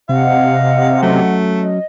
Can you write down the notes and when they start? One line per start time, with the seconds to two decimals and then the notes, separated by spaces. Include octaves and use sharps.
0.09 C3 D#5 F5 F#5
1.03 F#3 A3 C#4
1.60 D#5